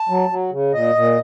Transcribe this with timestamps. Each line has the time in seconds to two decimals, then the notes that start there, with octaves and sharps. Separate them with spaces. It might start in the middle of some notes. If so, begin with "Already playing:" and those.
Already playing: A5
0.09 F#3
0.30 F#3
0.51 C#3
0.74 A#2 D#5
0.95 A#2